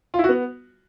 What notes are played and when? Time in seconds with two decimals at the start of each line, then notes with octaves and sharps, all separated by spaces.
0.14 F4
0.19 E4
0.24 F#4
0.29 B3